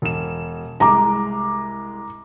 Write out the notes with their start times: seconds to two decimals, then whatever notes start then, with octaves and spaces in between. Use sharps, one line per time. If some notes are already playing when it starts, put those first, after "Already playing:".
0.02 E1 E7
0.80 C2 G#3 A#5 D6